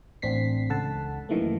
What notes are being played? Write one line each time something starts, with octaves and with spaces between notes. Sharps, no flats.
A1 C4 D4 B6 C7
C#2 A4 F#5 A5
F#2 D#3 E3 A3 A#3